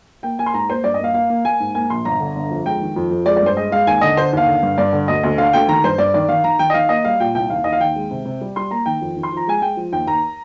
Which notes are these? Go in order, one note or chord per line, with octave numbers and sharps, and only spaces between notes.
A#3 G5
A#3 G#5
C6
G#2 A#5
A#3 C5
G2 D5
D#5
A#3 F5
A#3 F5
A#3
A#3 G#5
G#2
A#3 G#5
A#1 C6
G1 A#5
D3
G1
F2
G#3 G5
D#3
F2
F2
G#3 D5
D5
G2 C5
G#3 D#5
G#3 F5
D#2 G#5
D3 D#5
D3 C5
D#2 F5
D3
G2
G2 D5
D3
D2 D#5
D2
D3 F5
D2 G5
D#3 A#5
G2 C5
G2 D5
D#3 D5
D#3 F5
D#3 A#5
D#3 G5
D#5
D#3 F5
A#3 D#5
G3 F5
A#2 G5
C2 G5
D#2 F5
D#2 D#5
F5
D#3 G5
G#3
C3
C3
G3
G3 C6
A#3 A#5
D#3 G5
F2
D#3
C6
F3 A#5
G#3 G#5
G#3 G5
F3
D#2 G5
D#2 A#5